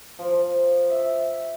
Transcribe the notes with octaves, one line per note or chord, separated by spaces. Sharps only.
F3
E5